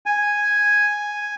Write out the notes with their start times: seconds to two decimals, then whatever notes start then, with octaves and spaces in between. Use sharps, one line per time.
0.06 G#5